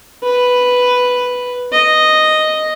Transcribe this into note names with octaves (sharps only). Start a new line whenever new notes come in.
B4
D#5